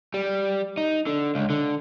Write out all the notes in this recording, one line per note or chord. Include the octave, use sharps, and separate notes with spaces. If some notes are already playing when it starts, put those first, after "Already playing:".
G3
D#4
D3
C#2
D3